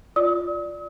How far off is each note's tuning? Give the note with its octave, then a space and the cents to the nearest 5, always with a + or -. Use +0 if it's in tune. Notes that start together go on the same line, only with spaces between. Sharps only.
F4 +0 D5 +0 D#6 +45